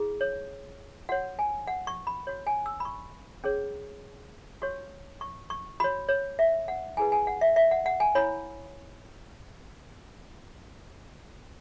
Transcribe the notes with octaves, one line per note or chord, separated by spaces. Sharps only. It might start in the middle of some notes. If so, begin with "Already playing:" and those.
Already playing: E4 G#4
C#5
F#4 C#5 F#5
G#5
F#5
C#6
B5
F#4 C#5
G#5
E6
B5
C#6
C#4 G#4 C#5
F#4 C#5 C#6
C#6
C#6
F#4 C#5 B5
C#5
E5
F#5
E4 G#4 B4 G#5
G#5
F#5
E5
E5
F#5
F#5
G#5
E4 C#5 B5